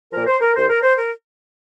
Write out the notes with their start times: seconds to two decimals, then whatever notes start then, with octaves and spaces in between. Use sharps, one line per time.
0.13 A#2 F3 A#4
0.27 C5
0.41 A#4
0.55 C2 C5
0.69 A#4
0.82 C5
0.97 A#4